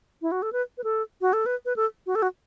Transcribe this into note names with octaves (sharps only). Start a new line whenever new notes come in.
E4
F#4
A4
B4
B4
A4
F#4
A4
B4
B4
A4
F#4
A4
F#4